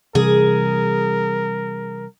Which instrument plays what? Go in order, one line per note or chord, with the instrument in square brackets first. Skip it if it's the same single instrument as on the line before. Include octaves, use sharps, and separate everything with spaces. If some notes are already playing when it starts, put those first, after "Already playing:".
[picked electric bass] C3 E3 G3 [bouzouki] G#4 [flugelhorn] A#4